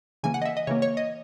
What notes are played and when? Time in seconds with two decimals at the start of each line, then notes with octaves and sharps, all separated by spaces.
0.23 C#3 E3 A#3 G#5
0.34 F#5
0.42 D#5
0.45 E5
0.57 D#5
0.67 C#3 E3 A#3 C#5
0.82 C#5
0.97 D#5